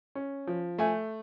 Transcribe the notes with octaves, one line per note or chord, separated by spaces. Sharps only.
C#4
F3
A3 G#5